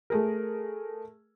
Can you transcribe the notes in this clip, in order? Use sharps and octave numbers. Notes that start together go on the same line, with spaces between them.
A3 G#4 A#4